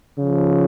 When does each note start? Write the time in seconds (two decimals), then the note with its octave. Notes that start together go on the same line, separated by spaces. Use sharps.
0.19 C#3 F3